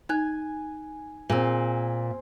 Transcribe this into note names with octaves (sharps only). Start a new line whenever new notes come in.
D#4 G#5 F#6 G#6
A#2 C4 G#4